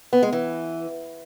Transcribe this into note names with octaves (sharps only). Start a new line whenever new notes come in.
B3
G#3
E3